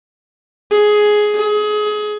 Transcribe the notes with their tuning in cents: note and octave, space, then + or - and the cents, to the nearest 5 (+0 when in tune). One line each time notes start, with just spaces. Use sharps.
G#4 +10
G#4 +25